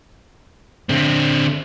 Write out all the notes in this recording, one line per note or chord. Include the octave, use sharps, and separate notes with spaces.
D3 C4